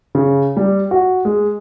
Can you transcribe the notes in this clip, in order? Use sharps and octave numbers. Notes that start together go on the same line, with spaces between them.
C#3
G3
F#4
G#3